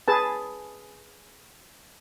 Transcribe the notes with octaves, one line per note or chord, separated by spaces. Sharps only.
G#4 B4 A5